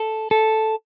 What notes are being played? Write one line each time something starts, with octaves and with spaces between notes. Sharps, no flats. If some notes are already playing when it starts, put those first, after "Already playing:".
Already playing: A4
A4